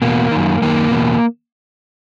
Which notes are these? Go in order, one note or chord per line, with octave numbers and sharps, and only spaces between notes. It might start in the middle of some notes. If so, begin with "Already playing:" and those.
E2 B2 A#3
F#2 D#3
F#2 D#3 A#3
E2 B2